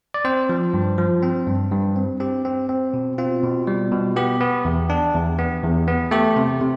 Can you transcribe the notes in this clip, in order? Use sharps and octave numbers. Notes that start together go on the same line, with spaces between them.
D5
C4 C5
F3
G2
F3
C4
G2
G2
C4
C4 G4
C4
C4
B2
C4 F4
B2
G3
B2
B3 G4
B3
E2
D4
E2
B3
E2
B3
A3 G4
C3
C3